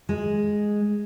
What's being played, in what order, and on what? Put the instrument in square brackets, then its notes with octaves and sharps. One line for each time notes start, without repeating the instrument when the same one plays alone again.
[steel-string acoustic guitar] G#3